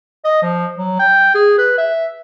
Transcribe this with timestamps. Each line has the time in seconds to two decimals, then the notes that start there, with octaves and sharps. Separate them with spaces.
0.24 D#5
0.42 F3
0.78 F#3
0.99 G5
1.35 G#4
1.58 B4
1.78 E5